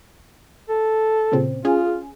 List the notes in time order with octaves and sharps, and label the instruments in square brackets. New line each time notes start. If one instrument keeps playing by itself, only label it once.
[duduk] A4
[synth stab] A#2 C#3 C4
[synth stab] C#4 G#4 [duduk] F4